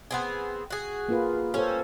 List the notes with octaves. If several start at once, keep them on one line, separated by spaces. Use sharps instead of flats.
B3 C4 G#4
F#4 G#4
A#3 F4 B4
C#4 G4 A4 C5